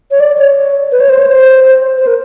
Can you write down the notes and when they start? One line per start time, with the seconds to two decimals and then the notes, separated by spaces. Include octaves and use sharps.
0.11 C#5
0.20 D5
0.38 C#5
0.92 B4
1.00 C#5
1.09 C5
1.19 C#5
1.27 C5
1.98 C5
2.07 A#4